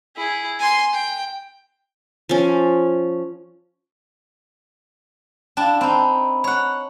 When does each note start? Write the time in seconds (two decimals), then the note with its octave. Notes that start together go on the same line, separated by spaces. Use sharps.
0.16 E4 G#4
0.59 G#5 C6
0.93 G5
2.29 F3 C#4
5.57 D4 E4 F5 G5 A5
5.81 C4 D#4 B5
6.44 C#5 F#5